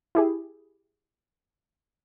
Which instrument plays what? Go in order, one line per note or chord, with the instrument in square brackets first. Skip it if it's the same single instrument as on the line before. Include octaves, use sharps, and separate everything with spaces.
[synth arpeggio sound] E4 G4 G#4